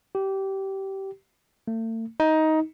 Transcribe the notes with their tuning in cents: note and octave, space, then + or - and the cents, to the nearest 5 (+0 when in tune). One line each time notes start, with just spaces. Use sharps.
G4 -20
A3 +40
D#4 +15